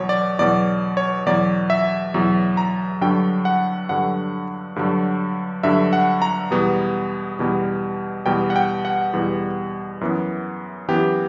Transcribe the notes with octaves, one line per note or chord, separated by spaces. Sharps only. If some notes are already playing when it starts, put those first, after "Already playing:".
Already playing: E2 B2 F#3 C#5
D5
E2 B2 F#3 D5
C#5
E2 B2 F#3 D5
E5
E2 B2 F#3
A#5
G2 D3 F#3 G5
F#5
G2 D3 F#3 F#5
G2 D3 F#3
G2 D3 F#3 E5
F#5
A#5
E2 B2 G3 B3
E2 B2 G3 B3
E2 B2 G3 B3 G5
F#5
G5
F#5
E2 B2 G3 B3
F#2 E3 B3
F#2 E3 B3 G4